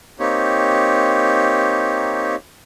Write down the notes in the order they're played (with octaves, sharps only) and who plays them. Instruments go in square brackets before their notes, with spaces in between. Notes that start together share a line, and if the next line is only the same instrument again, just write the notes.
[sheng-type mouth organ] A#3 C4 D#4 G4 C#5